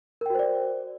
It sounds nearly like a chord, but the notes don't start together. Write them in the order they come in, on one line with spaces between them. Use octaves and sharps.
A#4 G5 F#4 C5 D5